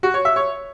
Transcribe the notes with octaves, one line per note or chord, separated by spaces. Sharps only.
F#4
C#5
E5
C#5